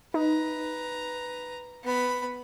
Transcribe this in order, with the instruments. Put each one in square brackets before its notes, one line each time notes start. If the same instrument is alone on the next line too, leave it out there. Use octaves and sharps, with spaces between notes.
[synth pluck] D#4 [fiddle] B4 A#5
[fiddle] B3 B5